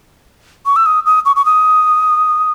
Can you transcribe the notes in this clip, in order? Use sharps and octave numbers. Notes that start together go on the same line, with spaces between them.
C#6
E6
D#6
D#6
C#6
C#6
D#6